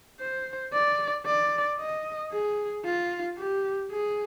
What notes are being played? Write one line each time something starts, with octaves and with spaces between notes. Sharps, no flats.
C5
D5
D5
D#5
G#4
F4
G4
G#4